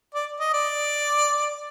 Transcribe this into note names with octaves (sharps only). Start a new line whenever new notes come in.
D5
D#5
D5